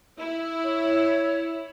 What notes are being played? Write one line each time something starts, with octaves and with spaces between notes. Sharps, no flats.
E4
C#5